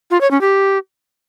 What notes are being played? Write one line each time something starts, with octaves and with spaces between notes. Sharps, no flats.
F4
C#5
C#4
G4